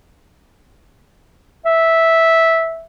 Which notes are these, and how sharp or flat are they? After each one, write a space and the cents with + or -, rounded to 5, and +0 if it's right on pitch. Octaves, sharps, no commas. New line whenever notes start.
E5 -10